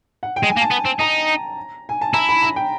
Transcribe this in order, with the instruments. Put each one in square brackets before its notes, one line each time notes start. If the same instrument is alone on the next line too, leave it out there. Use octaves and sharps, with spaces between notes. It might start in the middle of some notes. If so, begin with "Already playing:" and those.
[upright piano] F#5
G5
[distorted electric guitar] G#3
[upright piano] G#5
[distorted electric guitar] A#3
[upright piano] A5
[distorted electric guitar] B3
C4
[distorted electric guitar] D#4 [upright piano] A#5
[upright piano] G#5
A5
[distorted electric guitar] E4 [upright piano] A#5
[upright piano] B5
A#5
G5